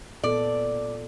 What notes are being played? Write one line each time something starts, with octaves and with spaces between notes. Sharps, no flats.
A#2 B3 A4 D5